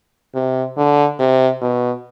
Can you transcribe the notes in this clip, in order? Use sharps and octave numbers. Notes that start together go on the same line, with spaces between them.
C3
D3
C3
B2